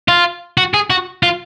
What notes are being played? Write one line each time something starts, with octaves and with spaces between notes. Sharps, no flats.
F4
F#4
G#4
F#4
F4